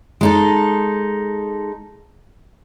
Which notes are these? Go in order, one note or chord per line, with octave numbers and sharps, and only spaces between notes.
G#3 D#4 A4